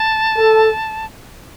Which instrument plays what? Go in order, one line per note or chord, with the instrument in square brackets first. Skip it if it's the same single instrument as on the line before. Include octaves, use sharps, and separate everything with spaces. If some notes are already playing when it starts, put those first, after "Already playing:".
Already playing: [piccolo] A5
[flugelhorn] A4